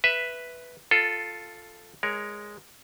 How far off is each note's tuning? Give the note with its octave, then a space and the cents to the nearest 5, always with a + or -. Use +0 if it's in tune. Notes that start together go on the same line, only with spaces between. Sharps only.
B4 +0 E5 +0
F4 +0 A4 +0
G#3 -5 A#4 +10 C#5 +15